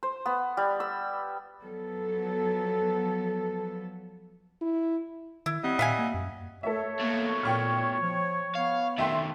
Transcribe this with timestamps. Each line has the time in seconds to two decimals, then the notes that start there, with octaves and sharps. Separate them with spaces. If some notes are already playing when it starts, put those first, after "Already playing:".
0.03 C5
0.26 B3
0.57 G3
0.80 E6
1.63 F3 F#3 B3 A4
4.62 E4
5.46 D#3 E4
5.64 G3 C4 D#5 F#5
5.79 A#2 E5 F5 G#5
5.99 A#3
6.14 F#2
6.63 A3 A4 C#5 E5
7.00 B2 A3 A#3
7.43 A#2 G5 C#6 F6
8.01 F3
8.55 B3 F5
8.99 D#3 A3 E5 G5 C6